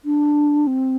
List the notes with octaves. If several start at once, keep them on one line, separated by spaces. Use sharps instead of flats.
D4
C4